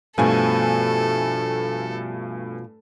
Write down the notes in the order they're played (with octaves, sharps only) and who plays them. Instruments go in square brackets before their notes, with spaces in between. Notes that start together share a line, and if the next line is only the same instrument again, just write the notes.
[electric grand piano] G2 A3 G#5 [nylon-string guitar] B2 F3 [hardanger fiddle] A4